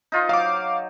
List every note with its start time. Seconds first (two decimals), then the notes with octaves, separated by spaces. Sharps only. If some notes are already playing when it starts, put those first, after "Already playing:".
0.12 D#4 F4
0.29 F#3 F5 D6